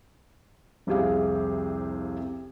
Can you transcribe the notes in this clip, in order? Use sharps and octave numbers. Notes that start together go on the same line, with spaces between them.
F1 C2 C3 G4 G#4 F5